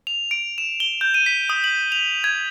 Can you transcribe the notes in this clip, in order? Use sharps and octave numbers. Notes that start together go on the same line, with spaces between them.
F7
D7
E7
G7
G6
D#7
B6
D#6
F#7
F7
G#6